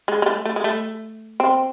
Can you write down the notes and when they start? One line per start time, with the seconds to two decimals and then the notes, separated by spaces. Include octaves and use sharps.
0.08 G#3
0.22 G#3
0.26 A3
0.45 A3
0.56 G#3
0.64 A3
1.40 C4